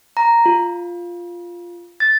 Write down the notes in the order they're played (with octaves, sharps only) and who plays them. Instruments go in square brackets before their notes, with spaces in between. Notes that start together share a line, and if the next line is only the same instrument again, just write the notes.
[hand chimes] A#5
F4
A6